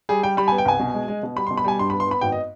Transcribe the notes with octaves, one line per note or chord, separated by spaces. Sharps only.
G3 G#4
G3 G5
G3 B5
B3 G#5
G5
C2 G#5
B2
G#3
G#3
B2
G3 B5
C6
B2
B5
G3 G#5
G2 C6
B5
B3
C6
B3 B5
G#1 G5
D#5